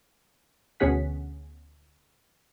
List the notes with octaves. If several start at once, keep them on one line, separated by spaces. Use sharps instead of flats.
D2 B2 C#4 G#4 F#5 B6